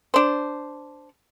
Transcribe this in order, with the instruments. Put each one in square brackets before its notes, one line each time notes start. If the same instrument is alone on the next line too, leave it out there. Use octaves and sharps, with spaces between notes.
[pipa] D4 C5